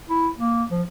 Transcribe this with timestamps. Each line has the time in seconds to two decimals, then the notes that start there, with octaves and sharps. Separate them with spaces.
0.10 E4
0.39 A#3
0.70 F3